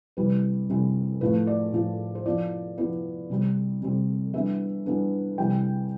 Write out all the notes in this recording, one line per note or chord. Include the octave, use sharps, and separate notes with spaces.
C3 E3 G3 C4 E4 B4
C3 E3 G3 C4 E4
A2 F3 A3 E4 B4
D5
A2 F3 A3 E4
C5
F3 B3 E4 D5
F3 B3 E4
C3 G3 C4
C3 G3 C4
E3 G3 B3 D4 E5
E3 G3 B3 D4
C3 E3 G3 G5